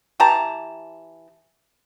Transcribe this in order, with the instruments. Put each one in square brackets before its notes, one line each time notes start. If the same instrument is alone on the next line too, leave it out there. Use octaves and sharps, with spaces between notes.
[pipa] E3 G4 A5 A#5